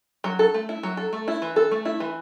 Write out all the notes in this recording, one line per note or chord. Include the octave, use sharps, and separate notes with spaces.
F#3
A4
A3
E4
F#3
A4
A3
E4
E3
A4
A3
E4
E3